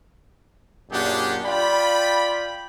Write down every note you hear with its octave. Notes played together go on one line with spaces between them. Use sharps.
F#2 A#2 D4 G4 G#4 F#5
F4 D5 G5 B5